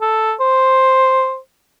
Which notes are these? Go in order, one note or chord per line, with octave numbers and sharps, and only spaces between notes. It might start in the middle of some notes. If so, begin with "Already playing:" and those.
A4
C5